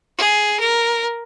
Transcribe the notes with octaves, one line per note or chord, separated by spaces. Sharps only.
G#4
A#4